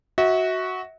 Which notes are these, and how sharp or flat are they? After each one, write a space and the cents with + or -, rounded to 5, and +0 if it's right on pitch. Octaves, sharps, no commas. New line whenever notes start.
F#4 +0 E5 -35